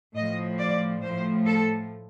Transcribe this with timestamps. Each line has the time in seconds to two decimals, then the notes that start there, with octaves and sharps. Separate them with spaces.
0.15 A2 F3 D#5
0.59 D5
1.02 A2 F3 C5
1.46 A4